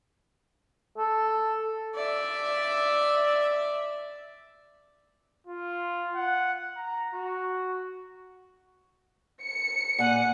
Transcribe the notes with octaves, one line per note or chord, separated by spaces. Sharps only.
A4
D5 E5
F4
F#5
A#5
F#4
C#7
A#2 F#5 G#5